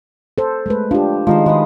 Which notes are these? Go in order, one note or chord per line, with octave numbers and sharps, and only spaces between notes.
A4 C5
G#3 A3 B4
F3 D4 G4
D#3 F3 G#3 D#4 C5
D#3 G#3 F#4 B4 D#6